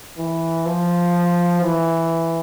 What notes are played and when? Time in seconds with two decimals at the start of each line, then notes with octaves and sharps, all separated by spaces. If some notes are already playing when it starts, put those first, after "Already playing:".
0.18 E3
0.66 F3
1.62 E3